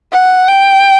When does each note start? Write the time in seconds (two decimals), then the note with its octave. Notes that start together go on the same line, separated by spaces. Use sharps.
0.12 F#5
0.48 G5